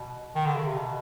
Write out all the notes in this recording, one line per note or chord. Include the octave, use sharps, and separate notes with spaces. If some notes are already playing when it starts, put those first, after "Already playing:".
Already playing: B2
D#3
D3
C#3
C3
B2